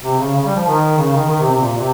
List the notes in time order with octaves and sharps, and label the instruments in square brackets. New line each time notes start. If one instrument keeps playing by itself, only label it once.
[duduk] C3
C#3
C#3
G3
F3
D#3
C#3
D#3
D#3
C3
C3
A#2
C3